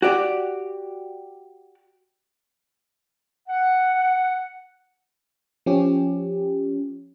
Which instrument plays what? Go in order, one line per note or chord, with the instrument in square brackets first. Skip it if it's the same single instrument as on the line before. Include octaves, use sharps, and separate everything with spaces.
[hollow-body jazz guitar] F#4 G4 D5
[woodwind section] F#5
[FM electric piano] F3 C#4 G4